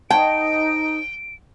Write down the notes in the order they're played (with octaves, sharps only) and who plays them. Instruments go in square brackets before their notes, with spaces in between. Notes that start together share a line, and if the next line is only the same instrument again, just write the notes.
[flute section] D#4 [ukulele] C5 C#5 A5 [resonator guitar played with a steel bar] G5 [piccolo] D7